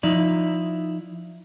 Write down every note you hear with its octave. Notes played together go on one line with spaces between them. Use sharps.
F3 D#4 E4 D5